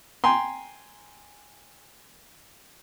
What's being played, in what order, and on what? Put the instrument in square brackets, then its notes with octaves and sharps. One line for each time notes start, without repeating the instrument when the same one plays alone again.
[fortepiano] G5 G#5 A#5 C6